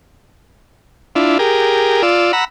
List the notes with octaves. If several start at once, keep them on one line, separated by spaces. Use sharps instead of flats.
D4 E4 F4
G4 G#4 A#4
F4 D5 E6
F#5 A#5 B5 E6